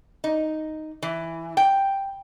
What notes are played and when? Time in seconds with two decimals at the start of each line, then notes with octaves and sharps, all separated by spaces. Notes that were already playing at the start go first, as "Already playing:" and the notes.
0.24 D#4
1.02 E3
1.57 G5